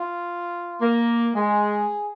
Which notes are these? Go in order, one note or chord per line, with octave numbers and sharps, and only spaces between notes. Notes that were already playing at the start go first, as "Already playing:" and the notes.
Already playing: F4
A#3
G#3 G#4